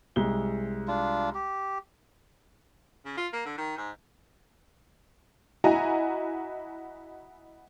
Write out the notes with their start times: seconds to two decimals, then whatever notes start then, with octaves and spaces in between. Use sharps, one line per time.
0.16 C2 G#3 G7
0.88 D4 F4
1.35 G4
3.05 C#3
3.17 F4
3.33 A#3
3.46 D3
3.57 D#3
3.78 G#2
5.64 E4 F#4 D#5 G#5 A#5